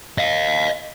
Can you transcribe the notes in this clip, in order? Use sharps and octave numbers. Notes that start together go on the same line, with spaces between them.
D#5 F5